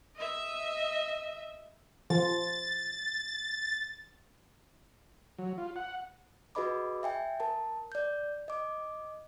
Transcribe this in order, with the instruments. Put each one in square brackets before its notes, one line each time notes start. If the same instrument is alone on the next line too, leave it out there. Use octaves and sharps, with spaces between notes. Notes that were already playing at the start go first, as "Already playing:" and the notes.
[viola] D#5 E5
[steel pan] F3 [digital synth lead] A6
[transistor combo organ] F#3
F4
F#5
[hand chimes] F#4 G#4 B4 D#5 B5 D6
E5 G5 G#5
A#4 A5
D5 G6
D#5 D6